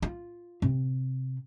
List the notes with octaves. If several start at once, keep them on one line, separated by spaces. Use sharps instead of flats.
F4
C3